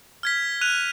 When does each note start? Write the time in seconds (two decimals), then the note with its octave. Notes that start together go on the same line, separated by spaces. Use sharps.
0.23 F6 G#6 B6
0.61 F#6 D#7 F7